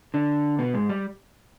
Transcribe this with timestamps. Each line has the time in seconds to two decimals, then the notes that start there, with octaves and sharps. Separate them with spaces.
0.14 D3 D4
0.59 B2 B3
0.74 G#2 G#3
0.89 G3